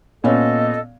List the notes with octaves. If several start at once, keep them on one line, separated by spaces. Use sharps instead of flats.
A#2 B3 C#4 A4 D#5